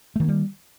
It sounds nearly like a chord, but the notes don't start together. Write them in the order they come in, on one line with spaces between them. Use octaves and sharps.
A3 D#3 A#3 G3